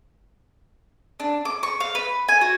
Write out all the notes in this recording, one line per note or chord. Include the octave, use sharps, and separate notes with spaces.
D4
D6
C#6
F5
B4
G#5
F#4